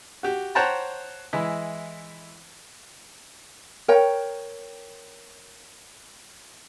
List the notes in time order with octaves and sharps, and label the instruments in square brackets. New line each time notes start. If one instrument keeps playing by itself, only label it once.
[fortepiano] F#4 G4
C5 C#5 F#5 G5 A5 A#5
E3 G#3 E4
[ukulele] A#4 C#5 G5